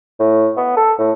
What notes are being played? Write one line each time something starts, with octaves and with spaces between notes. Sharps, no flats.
A2
B3
A4
A2